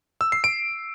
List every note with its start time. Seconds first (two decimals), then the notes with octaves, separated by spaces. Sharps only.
0.21 E6
0.32 C7
0.44 D7